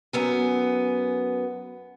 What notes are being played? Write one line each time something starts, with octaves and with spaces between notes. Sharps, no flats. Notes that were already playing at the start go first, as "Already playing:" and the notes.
F#2 B3 G#5